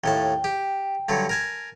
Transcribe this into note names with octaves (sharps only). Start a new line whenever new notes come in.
D#2 A2 G5 A5
G4
G2 D3 F#3
A#4 G#5 A5